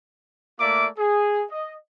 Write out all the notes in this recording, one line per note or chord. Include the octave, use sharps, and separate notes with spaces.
A3 A#3 F4 D5 E5 D6
G#4
D#5